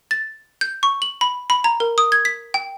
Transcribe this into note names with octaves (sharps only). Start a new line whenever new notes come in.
A6
G6
C#6
F#7
B5
B5
A#5
A#4
D#6
G#6
B6
G5